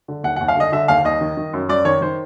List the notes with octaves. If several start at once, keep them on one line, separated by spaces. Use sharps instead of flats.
D3
D#2 F#5
F#5
D#2
F5
D3 D#5
D3 E5
D#2 F5
D#2 D#5
D#3
D#3
F#2
F#2 D5
D#3 C#5
D#3 C5